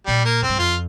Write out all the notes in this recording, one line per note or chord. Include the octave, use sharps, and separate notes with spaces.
A#2 G3
A#3
F2 C4
G2
F2 F4